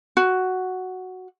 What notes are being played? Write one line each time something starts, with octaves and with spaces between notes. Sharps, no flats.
F#4